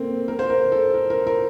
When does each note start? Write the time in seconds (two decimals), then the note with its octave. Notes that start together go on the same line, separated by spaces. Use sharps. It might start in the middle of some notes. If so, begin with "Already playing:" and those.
Already playing: A3 A#3 C4
0.28 A#4
0.39 C5
0.50 A#4
0.72 A4
0.94 A#4
1.10 A#4
1.27 A#4